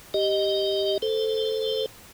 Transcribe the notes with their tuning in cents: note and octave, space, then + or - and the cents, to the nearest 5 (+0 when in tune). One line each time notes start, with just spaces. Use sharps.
G4 +0 D#5 +0
A4 +0 C5 +0